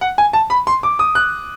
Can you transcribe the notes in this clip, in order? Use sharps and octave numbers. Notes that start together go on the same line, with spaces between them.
F#5
G#5
A5
B5
C6
D6
D#6
F#6